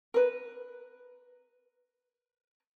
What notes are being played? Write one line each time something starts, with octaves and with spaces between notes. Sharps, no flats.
A#4 B4